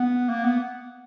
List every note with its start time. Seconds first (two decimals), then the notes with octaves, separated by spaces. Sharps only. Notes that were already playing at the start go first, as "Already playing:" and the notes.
Already playing: B3
0.29 A#3
0.44 B3